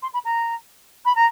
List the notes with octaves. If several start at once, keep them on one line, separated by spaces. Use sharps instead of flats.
C6
B5
A#5
B5
A#5